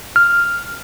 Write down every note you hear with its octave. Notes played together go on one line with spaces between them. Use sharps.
F6